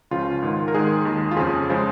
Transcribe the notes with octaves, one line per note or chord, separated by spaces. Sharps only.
C#2 C#3 F3 F4
G#2 D#3 G#3
A#4
G#2 D#3 G#3 G#4
D#2 D#3 G#3
F4
F2 C#3 F3 G#4
C#3 F3 G#3